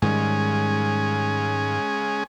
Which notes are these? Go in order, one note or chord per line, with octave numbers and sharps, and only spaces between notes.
G#2 D#3 G3 G#3 C#4 G#4